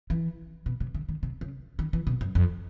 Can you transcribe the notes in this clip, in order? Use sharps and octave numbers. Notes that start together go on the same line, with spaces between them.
E3
B2
C3
D3
D#3
C3
C#3
D#3
E3
B2
F#2
F2